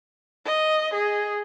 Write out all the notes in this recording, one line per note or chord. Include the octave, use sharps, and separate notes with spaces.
D#5
G#4